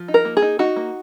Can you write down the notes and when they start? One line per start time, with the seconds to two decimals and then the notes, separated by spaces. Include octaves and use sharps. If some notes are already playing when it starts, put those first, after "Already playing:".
Already playing: F3
0.08 D#4
0.14 A#4
0.25 A#3
0.37 G#4
0.42 D#4
0.59 D#4 F#4
0.76 A#3